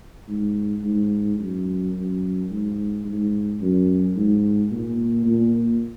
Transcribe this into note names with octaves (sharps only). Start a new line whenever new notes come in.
G#2
G#2
F#2
F#2
G#2
G#2
F#2
G#2
A#2
A#2